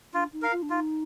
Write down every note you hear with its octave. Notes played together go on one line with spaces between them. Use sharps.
D4 F4
D#4
A#4 F5
F4
D4
D#4 F4